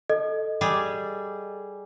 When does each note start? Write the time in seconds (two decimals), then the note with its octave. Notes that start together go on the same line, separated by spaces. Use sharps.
0.10 A4 D#5
0.61 G3 G#4